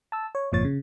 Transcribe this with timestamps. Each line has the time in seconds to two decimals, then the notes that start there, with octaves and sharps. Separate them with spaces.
0.12 A5 E6
0.35 C#5
0.52 G1 F2 A#2 F3 C#5 A6
0.65 C#3